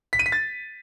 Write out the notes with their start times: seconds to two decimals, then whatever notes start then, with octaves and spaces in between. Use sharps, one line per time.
0.13 B6
0.19 D#7
0.26 B6
0.32 A6